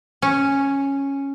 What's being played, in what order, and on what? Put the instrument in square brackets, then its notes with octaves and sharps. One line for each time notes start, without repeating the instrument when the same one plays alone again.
[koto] C#4